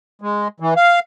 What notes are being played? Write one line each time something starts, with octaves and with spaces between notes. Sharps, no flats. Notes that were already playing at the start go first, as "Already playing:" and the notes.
G#3
E3
F5